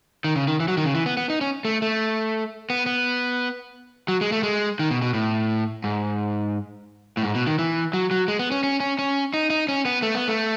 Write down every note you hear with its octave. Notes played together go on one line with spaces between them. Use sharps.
D#3
C#3
D#3
E3
F#3
D#3
C#3
E3
B3
B3
D#4
C#4
A3
A3
B3
B3
F#3
G#3
A3
G#3
D#3
B2
B2
A2
G#2
A2
G#2
B2
D#3
E3
F#3
F#3
G#3
B3
C#4
C#4
C#4
C#4
D#4
D#4
C#4
B3
A3
B3
A3